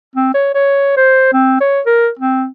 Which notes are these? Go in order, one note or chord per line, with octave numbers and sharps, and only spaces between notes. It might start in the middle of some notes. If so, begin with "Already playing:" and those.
C4
C#5
C#5
C5
C4
C#5
A#4
C4